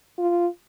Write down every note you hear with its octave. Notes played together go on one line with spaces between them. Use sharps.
F4